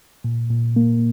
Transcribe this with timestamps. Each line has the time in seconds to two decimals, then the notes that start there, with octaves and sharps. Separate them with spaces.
0.24 A#2
0.51 A#2
0.76 A#3